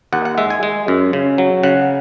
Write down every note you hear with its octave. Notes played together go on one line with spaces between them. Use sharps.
D#2 F#5
F#5
G#3 E5
G#5
G#3
F#2
C#3
F#3
C#3 F#5